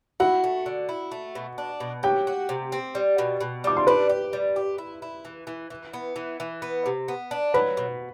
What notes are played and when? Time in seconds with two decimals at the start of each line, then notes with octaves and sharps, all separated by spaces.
0.20 E4 F#4 F#5
0.44 A3
0.66 D3
0.89 E4
1.11 A3
1.35 B2
1.58 D4
1.80 B2
2.03 F#3 G4 G5
2.27 F#4
2.49 C3
2.72 C4
2.95 G3
3.18 B2
3.41 B2
3.64 G3 D6
3.77 C6
3.87 D4 B4 B5
4.09 G4
4.33 G3
4.56 G4
4.78 E4
5.02 E4
5.25 E3
5.47 E3
5.70 E3
5.93 B3
6.16 E3
6.40 E3
6.62 B3
6.86 C3
7.08 B3
7.31 D4
7.54 F#3 B4 B5
7.77 B2